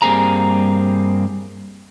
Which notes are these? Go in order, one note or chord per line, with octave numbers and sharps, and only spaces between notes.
G2 G3 A#3 C4 G#4 A#5